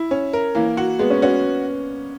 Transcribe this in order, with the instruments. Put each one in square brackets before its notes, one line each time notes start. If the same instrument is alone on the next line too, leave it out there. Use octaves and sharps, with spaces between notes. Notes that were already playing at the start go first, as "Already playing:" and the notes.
Already playing: [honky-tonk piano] E4
C#4
A#4
[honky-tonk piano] E3 [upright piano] A#3
[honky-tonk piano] F#4
[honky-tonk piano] G#3 [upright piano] B3
[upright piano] C#4
[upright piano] C#4 [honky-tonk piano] F#4